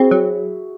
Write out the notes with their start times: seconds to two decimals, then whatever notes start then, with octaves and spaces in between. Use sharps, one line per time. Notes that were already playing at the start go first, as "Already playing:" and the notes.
Already playing: C4 E4 F#4 G#4
0.11 F#3